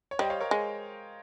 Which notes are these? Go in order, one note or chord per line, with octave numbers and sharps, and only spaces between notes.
C#5
G3 C5 D#5
G5
C#5 F5
A#4 C#5
G#3